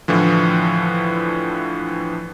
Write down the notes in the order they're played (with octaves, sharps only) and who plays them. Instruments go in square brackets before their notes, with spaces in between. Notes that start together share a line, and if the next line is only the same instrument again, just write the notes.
[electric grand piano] A2 D3 E3 F3